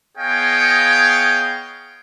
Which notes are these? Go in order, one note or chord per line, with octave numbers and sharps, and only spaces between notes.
B3 G#4 C#5 D#5 F5 G5